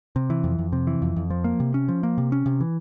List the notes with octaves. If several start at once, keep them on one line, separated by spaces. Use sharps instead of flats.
C3
E3
F2
F2
C3
E3
F2
F2
F3
A#3
C3
C#4
F3
A#3
C3
C#4
C3
E3